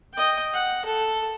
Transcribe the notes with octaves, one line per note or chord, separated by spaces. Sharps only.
D#5 G5
F#5
A4